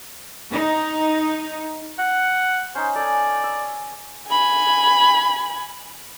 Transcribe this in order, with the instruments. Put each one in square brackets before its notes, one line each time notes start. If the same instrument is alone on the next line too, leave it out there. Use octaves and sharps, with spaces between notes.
[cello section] D#4
[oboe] F#5
[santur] C#4 D#4 [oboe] C5
[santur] A4 G#5 [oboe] D5
[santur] E6
[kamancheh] G#5 B5